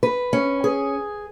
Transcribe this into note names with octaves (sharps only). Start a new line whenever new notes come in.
B4
C#4
G#4